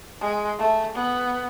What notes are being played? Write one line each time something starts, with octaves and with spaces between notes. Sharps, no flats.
G#3
A3
B3